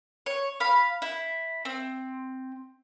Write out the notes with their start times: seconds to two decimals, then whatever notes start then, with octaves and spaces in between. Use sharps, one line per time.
0.26 C#5
0.60 F5 B5
1.02 E4
1.65 C4